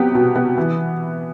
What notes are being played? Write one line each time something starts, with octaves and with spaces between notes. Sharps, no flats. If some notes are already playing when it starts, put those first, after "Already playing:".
Already playing: C3 F#3 B3 G4
B2
B3
E3